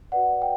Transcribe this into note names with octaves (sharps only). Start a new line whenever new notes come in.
F#4 B4 D5 F#5
G5